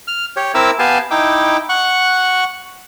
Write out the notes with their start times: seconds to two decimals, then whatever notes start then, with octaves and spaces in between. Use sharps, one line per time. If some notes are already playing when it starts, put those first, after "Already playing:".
0.07 F6
0.36 G4 C#5
0.54 C4 E4 A#4 E5 D6 E6
0.79 B3 G4 F5 G#5 A5
1.11 D#4 E4 G5 D6
1.69 F#5 C#6 F#6